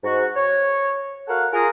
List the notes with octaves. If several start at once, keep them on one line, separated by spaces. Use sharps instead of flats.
G#2 F#4
C#5
F#4 A4 A#4 F5 F#5
F4 G#4 A#4